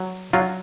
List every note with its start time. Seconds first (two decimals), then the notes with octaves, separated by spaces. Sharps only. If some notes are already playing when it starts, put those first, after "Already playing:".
Already playing: F#3
0.33 F#3 F4